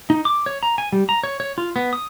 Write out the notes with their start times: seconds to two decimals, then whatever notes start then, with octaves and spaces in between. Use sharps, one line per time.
0.10 D#4
0.25 D6
0.46 C#5
0.63 A#5
0.78 G#5
0.93 G3
1.09 A#5
1.24 C#5
1.40 C#5
1.58 F4
1.76 B3
1.93 D#6